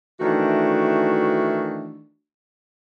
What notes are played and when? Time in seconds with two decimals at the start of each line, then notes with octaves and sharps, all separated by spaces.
0.20 D#3 E3 A3 D4 F#4